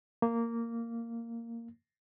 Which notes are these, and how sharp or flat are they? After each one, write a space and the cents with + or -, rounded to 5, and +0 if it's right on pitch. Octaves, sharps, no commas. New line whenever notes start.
A#3 -10